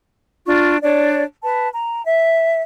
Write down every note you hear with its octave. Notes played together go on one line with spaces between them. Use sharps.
D4 F4 C#6
D4 C#5 D5
B4 A5
A#5
E5